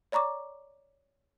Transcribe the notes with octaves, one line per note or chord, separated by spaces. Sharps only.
C#5 D5 A#5 C#6 D6